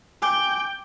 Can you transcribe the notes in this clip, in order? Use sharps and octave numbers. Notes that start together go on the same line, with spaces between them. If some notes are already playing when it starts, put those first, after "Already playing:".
G5 G#5 D6 G6